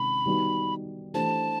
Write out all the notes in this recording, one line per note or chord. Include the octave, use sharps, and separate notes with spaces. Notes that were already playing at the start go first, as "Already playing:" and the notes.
Already playing: C3 D#3 G#3 C#4 B5
D#3 G3 B3 D#4 F#4
E3 A3 D4 G4 C5 A5